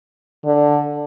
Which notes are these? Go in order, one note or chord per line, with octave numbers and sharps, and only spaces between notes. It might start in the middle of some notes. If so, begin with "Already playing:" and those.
D3